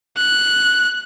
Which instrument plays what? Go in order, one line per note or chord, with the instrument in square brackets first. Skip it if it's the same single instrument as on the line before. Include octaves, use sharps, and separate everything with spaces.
[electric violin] F#6